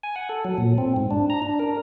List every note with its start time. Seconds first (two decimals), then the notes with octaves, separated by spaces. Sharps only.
0.03 G#5
0.16 F#5
0.29 A4
0.45 F#3
0.58 A#2
0.78 C4
0.96 G#2
1.11 D4
1.30 A#5
1.42 D4
1.59 A#4